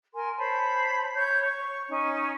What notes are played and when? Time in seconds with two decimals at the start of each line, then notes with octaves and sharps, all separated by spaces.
0.15 A#4 G#5 C6
0.37 C5 C#5 A5 B5
1.13 C#5 G6
1.47 C#6
1.88 C#4 D#4